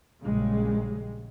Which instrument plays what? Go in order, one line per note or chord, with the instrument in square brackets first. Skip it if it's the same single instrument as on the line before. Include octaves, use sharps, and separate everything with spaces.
[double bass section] A#1 C#3 G3 G#3